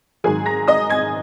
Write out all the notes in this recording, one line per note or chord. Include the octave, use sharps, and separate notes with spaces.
G#2 D#3 F#3 G#4 G#5
A#5 A#6
D#5 D#6
G#5 G#6